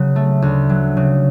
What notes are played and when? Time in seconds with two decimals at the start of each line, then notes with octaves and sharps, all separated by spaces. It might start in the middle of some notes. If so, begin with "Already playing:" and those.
Already playing: C#3 F#3
0.16 A3
0.42 D2
0.69 F#3
0.97 C#3